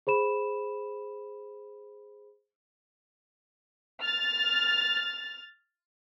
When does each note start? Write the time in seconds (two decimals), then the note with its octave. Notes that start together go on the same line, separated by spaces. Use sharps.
0.07 G#4 C5 B5 E7
4.01 F6 A6